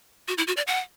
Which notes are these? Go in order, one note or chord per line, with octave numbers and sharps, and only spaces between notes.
F#4
E4
F#4
D5
F#5